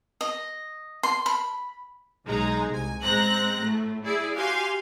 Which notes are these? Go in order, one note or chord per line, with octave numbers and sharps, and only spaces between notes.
D#5
C6
B5
B1 G#3 D#4 A#5
C2 G#5
A1 G#3 C4 A#5 F#6 A#6
A2 A3
E4 G#4 D5
F#4 G4 F5 G#5 C6